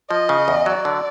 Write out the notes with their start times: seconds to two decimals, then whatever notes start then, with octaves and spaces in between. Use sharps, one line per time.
0.10 F3 D#5
0.29 C#3
0.48 E2
0.66 F#3 D5
0.85 D3